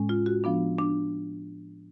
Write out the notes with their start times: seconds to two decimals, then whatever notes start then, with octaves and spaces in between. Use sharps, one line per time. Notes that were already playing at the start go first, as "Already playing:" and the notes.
Already playing: A2 G#3 C#4
0.09 F4
0.26 F#4
0.44 F3 B3 D4
0.78 D4